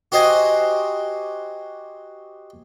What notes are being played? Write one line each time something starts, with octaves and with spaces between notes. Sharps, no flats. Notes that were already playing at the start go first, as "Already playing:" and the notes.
F#4 G4 C5 D#5 G#5